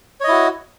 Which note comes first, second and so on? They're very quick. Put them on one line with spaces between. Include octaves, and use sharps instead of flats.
C#5 D#5 E4 F#4